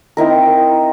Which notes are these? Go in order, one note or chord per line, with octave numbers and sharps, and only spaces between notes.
C4 D#4 E4 A#4